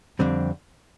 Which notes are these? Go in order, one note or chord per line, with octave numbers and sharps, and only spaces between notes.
F2 D3 G3 C4